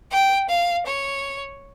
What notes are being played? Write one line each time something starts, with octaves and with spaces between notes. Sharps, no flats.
G5
F5
C#5